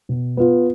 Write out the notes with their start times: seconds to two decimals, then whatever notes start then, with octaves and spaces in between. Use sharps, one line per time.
0.09 B2
0.37 B3 F4